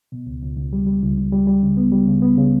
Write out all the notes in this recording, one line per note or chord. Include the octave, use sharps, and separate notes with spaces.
B2
C#2
C#2
C#2
G3
G3
C#2
C#2
G3
G3
C#3
B3
G3
C#3
B3
C#3